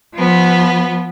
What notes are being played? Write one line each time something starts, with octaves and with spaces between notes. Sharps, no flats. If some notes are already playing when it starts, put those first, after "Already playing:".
F3 B3